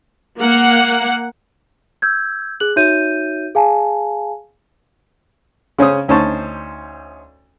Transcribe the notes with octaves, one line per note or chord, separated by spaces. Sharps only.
A#3 F#5
E6 G6 G#6
G#4 F#6 F#7
D#4 F#4 C#5 E5 G6 D#7
G#4 F5 G#5 A5
C#3 C#4 C5 D#6
D2 C#4 D#4 C5 A5 C#6